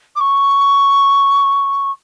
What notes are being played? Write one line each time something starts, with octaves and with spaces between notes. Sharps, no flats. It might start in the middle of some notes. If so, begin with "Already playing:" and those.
D6
C#6